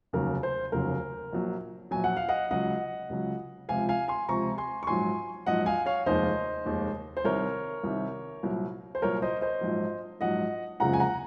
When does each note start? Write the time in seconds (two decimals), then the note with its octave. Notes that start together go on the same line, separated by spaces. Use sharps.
0.13 F1 D#2 C#3 F#3 A#4
0.43 C5
0.72 F1 D#2 C#3 F#3 A#4
1.32 A#1 A#2 F#3
1.91 A#1 A#2 F#3 G#5
2.04 F#5
2.17 F5
2.29 D#5 F#5
2.51 C#2 C#3 F#3 D#5 F#5
3.09 C#2 C#3 F#3
3.68 C#2 C3 F3 F5 G#5
3.89 F5 G#5
4.08 G#5 C6
4.28 C#2 C3 F3 A#5 C#6
4.58 G#5 C6
4.83 C#6
4.87 A#1 G#2 F#3 G#5 C6
5.46 A#1 G#2 F#3 D#5 F#5
5.66 F5 G#5
5.86 C#5 F5
6.06 F1 D#2 D#3 G#3 C5 D#5
6.65 F1 D#2 D#3 G#3
7.17 C5
7.24 C2 C3 D#3 A#4 C#5
7.84 C2 C3 D#3
8.43 C2 A#2 F#3
8.95 C5
9.02 C2 A#2 F#3 A#4 C#5
9.22 C5 D#5
9.41 C5 D#5
9.61 A#1 G#2 F#3
10.21 A#1 G#2 F#3 D#5 F#5
10.80 F#1 F2 C#3 F3 G#3 F#5 A#5
10.93 G#5
11.00 F#5 A#5